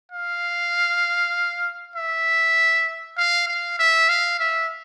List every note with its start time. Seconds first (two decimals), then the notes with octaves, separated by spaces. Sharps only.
0.12 F5
1.95 E5
3.17 F5
3.48 F5
3.79 E5
4.09 F5
4.40 E5